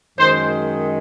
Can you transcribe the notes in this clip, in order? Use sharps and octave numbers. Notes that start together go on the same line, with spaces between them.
F#2 D#3 G#3 C5